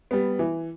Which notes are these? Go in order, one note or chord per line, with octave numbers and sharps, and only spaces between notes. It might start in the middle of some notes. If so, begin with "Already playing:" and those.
G3 B3
E3